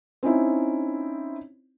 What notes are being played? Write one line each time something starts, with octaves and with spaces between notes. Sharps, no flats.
C4 C#4 D#4 E4